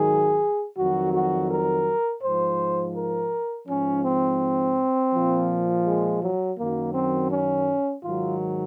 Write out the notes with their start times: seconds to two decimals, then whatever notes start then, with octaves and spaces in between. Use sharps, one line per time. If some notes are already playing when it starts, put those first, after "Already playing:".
Already playing: G#2 D#3 F#3 G#4
0.78 F2 D#3 F#3 F#4
1.14 F#4
1.50 A#4
2.22 G#2 C5
2.28 F3
2.96 A#4
3.67 G#2 F3 C#4
4.04 C4
5.14 A#2 F3
5.86 G#3
6.22 F#3
6.58 F#2 D#3 F#3 A#3
6.94 C4
7.31 C#4
8.04 G#2 D#3 F#3 F4